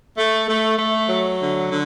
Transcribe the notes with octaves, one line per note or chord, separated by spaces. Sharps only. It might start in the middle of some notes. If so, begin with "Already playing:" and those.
A3
A3
A3
F#3
D3
D3